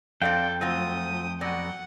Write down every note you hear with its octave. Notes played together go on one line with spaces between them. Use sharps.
F2 C4 A4 D5 F5 G5
F#3 A3 C4 F4 D#6
B2 F#3 D5 F#5